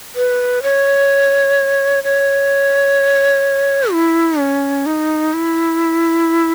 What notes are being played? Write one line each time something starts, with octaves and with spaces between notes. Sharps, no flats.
B4
C#5
C#5
E4
C#4
D#4
E4